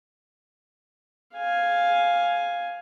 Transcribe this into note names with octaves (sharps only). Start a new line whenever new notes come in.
F5 G#5